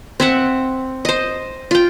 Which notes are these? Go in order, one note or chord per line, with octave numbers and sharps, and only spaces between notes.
C4 E5 F#5
C5 D#5
F4 G5